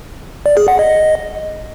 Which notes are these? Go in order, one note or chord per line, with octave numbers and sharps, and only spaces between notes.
D5
G#4
F#5
D#5